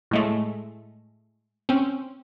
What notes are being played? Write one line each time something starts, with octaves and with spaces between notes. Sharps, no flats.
A2 G#3 A3
C4 C#4